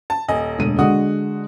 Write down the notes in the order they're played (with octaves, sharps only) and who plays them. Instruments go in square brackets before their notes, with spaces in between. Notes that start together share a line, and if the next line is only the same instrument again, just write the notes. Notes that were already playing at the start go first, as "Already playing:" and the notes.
[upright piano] A5
[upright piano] D#1 D#5 [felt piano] G#5
[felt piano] E1 D2 D#7
[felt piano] D3 G#3 D#6 [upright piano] F#4